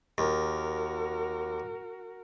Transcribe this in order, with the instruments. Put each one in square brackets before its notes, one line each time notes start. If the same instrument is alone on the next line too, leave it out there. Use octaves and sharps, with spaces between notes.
[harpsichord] D#2 [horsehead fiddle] F#4 A#4